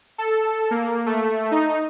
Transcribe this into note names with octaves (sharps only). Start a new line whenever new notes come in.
A4
A#3
A3
D#4